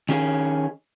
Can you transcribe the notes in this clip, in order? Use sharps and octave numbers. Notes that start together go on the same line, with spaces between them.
D#3 C#4 G#4